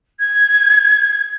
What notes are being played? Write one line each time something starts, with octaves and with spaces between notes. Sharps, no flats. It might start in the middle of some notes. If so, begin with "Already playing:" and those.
G#6